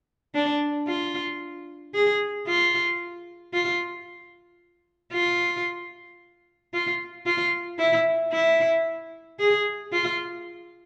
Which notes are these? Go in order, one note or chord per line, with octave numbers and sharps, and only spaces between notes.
D4
F4
G#4
F4
F4
F4
F4
F4
E4
E4
G#4
F4